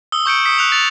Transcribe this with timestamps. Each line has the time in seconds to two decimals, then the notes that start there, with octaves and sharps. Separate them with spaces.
0.12 D#6 E6 G7
0.26 C#6 G6 C#7 D7
0.45 D#6 B6 C#7
0.59 F#6 F7
0.72 A6 F7